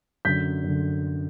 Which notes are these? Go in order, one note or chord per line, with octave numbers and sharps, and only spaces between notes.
F#2 D3 G6 B6
F#2 D3